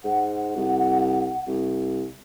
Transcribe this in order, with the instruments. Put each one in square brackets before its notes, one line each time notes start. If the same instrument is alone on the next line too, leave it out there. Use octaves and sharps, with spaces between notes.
[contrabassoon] G#2 [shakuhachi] F#5
[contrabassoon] C2
C2